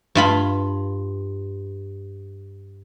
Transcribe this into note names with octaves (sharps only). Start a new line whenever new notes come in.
G2 F4 B5